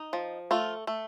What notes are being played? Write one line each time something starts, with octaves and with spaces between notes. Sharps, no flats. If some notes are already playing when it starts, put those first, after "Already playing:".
Already playing: D#4
F3
A3 F4
A3